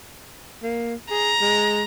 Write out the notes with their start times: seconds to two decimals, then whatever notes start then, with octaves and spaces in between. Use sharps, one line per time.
0.63 A#3
1.11 G#4 A#5
1.41 G#3